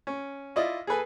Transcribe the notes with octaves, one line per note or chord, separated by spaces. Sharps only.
C#4
E4 F4 D5 D#5
G#4 A4 B4 G#5